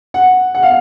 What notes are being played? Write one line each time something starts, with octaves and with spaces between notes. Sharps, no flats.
F#5
F#5
F5